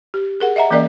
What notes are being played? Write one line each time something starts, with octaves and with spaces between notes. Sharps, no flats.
G4
G#4 A#4 F#5
D#5 E5 F#5 A#5
E3 A#3 C#4 A#4 D5 D#5